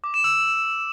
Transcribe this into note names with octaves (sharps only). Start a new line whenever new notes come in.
D6
E7
E6